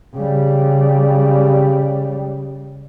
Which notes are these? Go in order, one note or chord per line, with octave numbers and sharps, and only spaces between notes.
C#3 G3